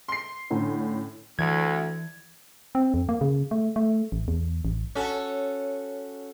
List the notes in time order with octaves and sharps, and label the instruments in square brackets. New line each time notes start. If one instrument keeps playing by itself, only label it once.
[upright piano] C6 C7
[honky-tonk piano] A2 D3 C#4
[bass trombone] D2 [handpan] E3 [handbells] G#6
[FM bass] C4
F2
A#3
C#3
A3
A3
A1
E2
A1
[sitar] C#4 F#4 A4